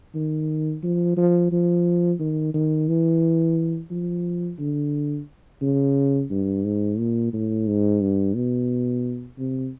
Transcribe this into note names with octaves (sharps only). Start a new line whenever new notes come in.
D#3
F3
F3
F3
D#3
D#3
E3
F3
D3
C#3
G2
G#2
A#2
A2
G#2
G2
B2
C3